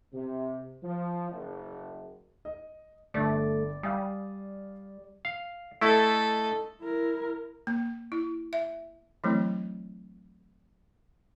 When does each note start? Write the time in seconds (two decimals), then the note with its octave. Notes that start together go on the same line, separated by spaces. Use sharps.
0.14 C3
0.83 F3
1.31 F#1
2.45 D#5
3.14 G1 D3 A3 D5
3.83 G3 F5 G#5 D#6
5.25 F5
5.81 A3 E4 A4 D#5
6.81 E4 A#4
7.67 A#3
8.12 E4
8.53 E5
9.24 E3 F#3 A3 C4 E4